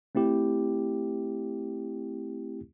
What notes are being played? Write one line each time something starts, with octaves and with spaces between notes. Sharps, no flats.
A3 C4 E4 G4